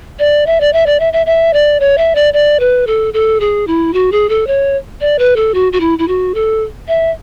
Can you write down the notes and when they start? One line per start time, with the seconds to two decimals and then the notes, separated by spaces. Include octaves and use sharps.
0.19 D5
0.46 E5
0.61 D5
0.73 E5
0.86 D5
1.00 E5
1.13 E5
1.26 E5
1.53 D5
1.80 C#5
1.98 E5
2.15 D5
2.33 D5
2.60 B4
2.87 A4
3.14 A4
3.40 G#4
3.67 E4
3.94 F#4
4.12 G#4
4.29 A4
4.47 C#5
5.01 D5
5.19 B4
5.36 A4
5.54 F#4
5.73 F#4
5.80 E4
5.99 E4
6.08 F#4
6.35 A4
6.88 E5